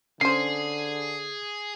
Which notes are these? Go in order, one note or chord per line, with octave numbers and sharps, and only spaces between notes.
D3 C#4 G#4 C5 C7